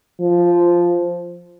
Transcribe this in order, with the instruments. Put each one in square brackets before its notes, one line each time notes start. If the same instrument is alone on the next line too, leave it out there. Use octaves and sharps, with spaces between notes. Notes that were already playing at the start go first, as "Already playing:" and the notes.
[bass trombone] F3